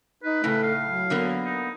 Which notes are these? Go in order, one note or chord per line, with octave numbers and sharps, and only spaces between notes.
D#4 B4
A2 C#3 A3
F5
F#3
D3 A#3 B3
D#4